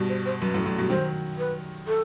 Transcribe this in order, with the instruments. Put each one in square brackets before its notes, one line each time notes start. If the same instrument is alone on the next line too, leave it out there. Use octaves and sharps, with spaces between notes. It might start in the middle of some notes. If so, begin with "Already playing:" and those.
Already playing: [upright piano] G2 B2
[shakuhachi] C5
C5
[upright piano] F#2 [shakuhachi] B4
[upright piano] F#2 A2
F#2 A2
G2 B2
[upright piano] D#3 F#3 [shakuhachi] C5
[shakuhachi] B4
A4